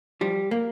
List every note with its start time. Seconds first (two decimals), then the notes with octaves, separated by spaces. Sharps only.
0.21 F3 G3
0.51 A#3